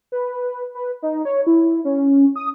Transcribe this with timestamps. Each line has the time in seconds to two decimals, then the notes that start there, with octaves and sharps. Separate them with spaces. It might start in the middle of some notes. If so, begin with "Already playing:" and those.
0.12 B4
0.75 B4
1.02 D#4
1.25 C#5
1.47 E4
1.85 C#4
2.36 D#6